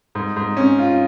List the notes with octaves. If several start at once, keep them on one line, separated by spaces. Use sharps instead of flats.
G#2
G#2
C#4
F4